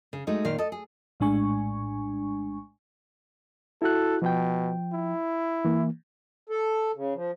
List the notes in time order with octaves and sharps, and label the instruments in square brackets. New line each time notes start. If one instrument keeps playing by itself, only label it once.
[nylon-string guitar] C#3
G#3 A3 D#4 F#4
A#2 D#3 F5
A4 D#5
G#4
[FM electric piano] A#1 A2 G#3 D4 G#5 C#6
[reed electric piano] E4 F#4 F#6 [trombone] A4
[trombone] B2 [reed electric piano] F3 G5
[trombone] E4
[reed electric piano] E3 A#3
[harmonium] A4
C#3
F3